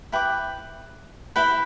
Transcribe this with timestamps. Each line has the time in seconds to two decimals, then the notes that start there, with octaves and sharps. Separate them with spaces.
0.12 E4 B4 G5 D6
1.36 E4 B4 G5 B5